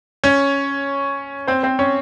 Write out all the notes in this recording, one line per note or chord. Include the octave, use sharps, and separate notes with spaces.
C#4 C#5
C4 C5
C4 C5
C#4 C#5